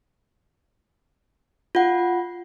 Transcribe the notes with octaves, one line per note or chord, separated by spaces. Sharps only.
F4 F#5